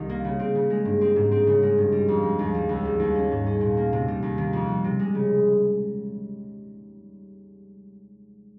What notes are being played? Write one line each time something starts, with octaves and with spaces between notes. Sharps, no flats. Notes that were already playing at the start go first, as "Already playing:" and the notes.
Already playing: C2 D#3 D#4
A#3
C#3
C4
C#3
G#3
G2
C4
G#2
C4
C#3
G#3
G2
G3
F2
G#3
D#2
G3
C#2
G3
D#2
C#4
G#2
C#4
A#2
A#3
C3
G3
D#2
D#3
F2
G3
C3
G#3
C#3